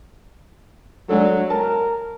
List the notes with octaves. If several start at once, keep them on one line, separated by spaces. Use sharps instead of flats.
F#3 G#3 D4 A4
A#4 A5